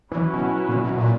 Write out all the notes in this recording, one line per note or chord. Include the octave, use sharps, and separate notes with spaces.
E3 F#3 C#4 E4 B4
B2
A#2
B2
A#2